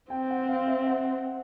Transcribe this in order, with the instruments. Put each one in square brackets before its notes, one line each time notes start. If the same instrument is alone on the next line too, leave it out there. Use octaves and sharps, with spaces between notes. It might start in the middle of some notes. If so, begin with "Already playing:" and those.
[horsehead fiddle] C4 [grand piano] G5
[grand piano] F#5
F5
E5
F#5